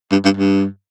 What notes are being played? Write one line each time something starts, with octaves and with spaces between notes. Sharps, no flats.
G2
G2
G2